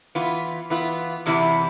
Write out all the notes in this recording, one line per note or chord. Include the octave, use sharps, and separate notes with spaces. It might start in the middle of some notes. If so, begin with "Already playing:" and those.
E3 B3 F4
E3 B3 F4
E2 C3 E3 B3 E4